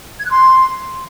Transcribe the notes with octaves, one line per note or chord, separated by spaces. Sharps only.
G#6
F#6
C6